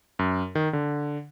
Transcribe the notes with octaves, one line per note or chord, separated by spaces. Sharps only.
F#2
D#3
D3